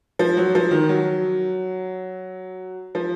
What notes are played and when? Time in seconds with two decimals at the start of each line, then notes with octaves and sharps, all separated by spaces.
0.19 F3
0.37 F#3
0.55 F3
0.71 D#3
0.89 F#3
2.95 F3